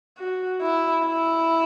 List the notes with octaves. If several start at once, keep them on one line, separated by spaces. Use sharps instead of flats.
F#4
E4
E4